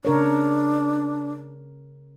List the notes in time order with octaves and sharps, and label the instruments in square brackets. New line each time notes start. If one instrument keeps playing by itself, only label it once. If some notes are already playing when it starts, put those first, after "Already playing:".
[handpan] C#3 A#4 C#5 [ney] D4